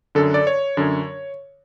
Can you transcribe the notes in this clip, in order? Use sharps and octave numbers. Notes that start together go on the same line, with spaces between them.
F#2 D3 A4
D5
C#5
F#2 D3